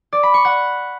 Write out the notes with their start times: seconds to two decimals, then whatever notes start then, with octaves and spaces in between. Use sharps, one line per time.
0.13 D5
0.23 B5
0.34 C#6
0.45 F#5